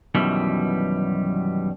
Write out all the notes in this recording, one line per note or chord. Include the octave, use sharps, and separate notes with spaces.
F#2 B2 D#3 E3 G3